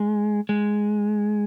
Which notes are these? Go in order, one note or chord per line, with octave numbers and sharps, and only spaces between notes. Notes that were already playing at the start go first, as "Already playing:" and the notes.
Already playing: G#3
G#3